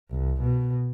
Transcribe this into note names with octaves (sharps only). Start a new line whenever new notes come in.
C2
B2